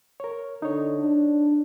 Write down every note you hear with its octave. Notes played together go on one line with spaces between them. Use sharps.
A#4 C#5
D3 D#4 C#5
D4